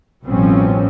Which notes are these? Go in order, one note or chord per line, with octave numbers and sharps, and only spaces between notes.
A1 B2 F3 G3 C4 C#4